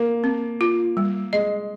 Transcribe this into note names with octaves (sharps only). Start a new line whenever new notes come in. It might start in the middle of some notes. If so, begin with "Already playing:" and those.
Already playing: A#3 A#4
C4
F4
G3
G#3 D#5